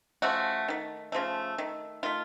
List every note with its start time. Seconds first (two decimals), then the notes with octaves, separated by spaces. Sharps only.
0.22 C#3 F3 A3 F#4
0.68 D#3 A3
1.12 C#3 F3 A3
1.58 D#3 A3
2.03 D#3 A3 F4